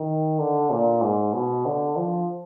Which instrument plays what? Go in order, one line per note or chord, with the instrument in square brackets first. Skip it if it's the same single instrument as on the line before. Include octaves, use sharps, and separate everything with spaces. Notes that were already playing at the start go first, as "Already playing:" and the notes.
Already playing: [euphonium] D#3
D3
A#2
G#2
B2
D3
F3